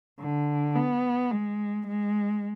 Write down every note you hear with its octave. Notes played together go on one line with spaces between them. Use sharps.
D3
B3
G#3
G#3